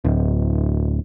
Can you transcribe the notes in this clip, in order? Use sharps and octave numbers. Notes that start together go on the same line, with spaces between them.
D1